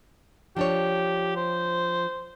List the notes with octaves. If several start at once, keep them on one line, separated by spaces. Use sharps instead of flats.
F3 D4 G4 C#5
C5